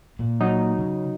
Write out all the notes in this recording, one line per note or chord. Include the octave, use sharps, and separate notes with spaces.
A#2
F#3 D#4
C#3